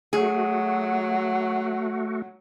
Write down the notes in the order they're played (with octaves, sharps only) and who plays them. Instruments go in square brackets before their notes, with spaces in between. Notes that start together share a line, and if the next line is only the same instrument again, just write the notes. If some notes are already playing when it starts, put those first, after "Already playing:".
[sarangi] F#3 [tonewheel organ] A3 F#4 [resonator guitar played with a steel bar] G#4